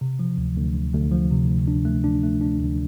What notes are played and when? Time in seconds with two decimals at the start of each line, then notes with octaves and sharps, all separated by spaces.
0.01 C3
0.19 F3
0.38 D2
0.57 D2
0.75 D2
0.94 D2
1.11 F3
1.31 C3
1.48 D2
1.68 D4
1.85 A3
2.04 D4
2.23 A3
2.41 D4
2.60 D2